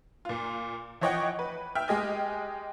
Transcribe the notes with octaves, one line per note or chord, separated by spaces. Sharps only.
A#2 F4
E3 F3 C#5 D#5 F#5 G5
B4
E5 G5 F6
G#3 G4 D#5 G#5